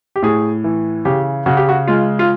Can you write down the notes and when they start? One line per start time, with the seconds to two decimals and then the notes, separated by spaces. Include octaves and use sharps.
0.16 G4
0.22 A2 G#4
0.64 E3
1.05 C#3 G4
1.46 C#3 F#4
1.57 G4
1.69 F#4
1.87 G#3 F4
2.19 F4